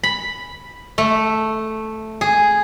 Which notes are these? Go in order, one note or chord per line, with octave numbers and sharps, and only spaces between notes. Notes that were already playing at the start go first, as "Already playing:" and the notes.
B5
A3
G#4